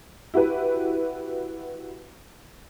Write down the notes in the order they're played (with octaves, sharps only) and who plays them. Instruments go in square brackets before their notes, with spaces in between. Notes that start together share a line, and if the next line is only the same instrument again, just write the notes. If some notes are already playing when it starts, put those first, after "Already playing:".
[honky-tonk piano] E4 F#4 G4 B4